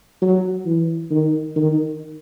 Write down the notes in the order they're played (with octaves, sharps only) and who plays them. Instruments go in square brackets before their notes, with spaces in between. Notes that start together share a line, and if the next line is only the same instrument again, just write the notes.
[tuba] F#3
E3
D#3
D#3